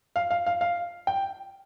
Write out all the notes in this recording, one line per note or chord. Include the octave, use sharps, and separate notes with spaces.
F5
F5
F5
F5
G5